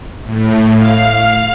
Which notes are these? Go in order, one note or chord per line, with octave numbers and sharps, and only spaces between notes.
A2
F5